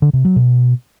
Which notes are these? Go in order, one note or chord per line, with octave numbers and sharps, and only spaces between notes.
D3
C3
F#3
B2